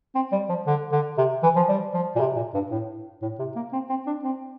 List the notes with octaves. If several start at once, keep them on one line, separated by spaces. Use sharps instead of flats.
C4
G3
F3
D3
D3
C3
E3
F3
G3
F3
A#2
C3
A#2
G2
A2
A2
C3
A#3
C4
C4
D4
C4